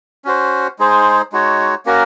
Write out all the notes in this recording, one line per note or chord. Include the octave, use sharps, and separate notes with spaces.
C#4 F#4 C5
G#3 D#4 G#4 C5
G#3 D#4 F#4 C#5
A#3 C#4 F#4 A#4